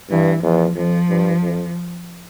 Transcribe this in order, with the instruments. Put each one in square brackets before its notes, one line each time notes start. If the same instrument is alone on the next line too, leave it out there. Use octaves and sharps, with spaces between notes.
[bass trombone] G2 [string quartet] E3
[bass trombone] E2 [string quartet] F3
[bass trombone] F2 [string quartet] F3
[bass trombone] G2
F2